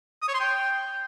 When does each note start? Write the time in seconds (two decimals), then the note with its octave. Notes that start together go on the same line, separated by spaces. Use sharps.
0.22 D#6
0.28 C#5
0.34 C6
0.40 G5